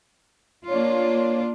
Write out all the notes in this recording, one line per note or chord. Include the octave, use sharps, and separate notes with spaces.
A#3 D4 F4 C#5